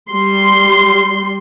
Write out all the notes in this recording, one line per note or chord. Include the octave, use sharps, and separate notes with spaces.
G3 C6